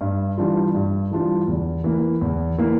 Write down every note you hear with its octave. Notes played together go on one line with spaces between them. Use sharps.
G2
E3 G3 D4 F4
G2
E3 G3 D4 F4
E2
E3 A#3
E2
E3 A#3